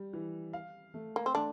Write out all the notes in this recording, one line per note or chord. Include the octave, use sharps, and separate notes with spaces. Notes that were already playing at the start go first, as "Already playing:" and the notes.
Already playing: G3
E3
F5
A3
A#3
C4
A3 D4